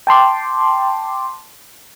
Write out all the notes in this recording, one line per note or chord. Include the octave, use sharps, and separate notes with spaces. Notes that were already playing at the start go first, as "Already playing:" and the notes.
G5 A5 C6 D6